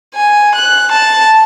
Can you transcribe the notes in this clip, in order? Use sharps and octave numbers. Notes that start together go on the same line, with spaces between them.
G#5
F#6
A5